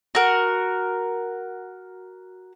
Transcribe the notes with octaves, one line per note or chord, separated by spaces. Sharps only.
F#4 A#4